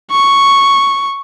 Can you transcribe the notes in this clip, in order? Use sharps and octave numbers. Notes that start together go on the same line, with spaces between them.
C#6